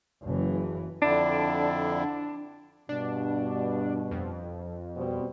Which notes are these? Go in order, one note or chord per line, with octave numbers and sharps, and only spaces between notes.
F#1 E3
F2 D3 D4 E4
G2 B2 D4
F2
B2 G3 C4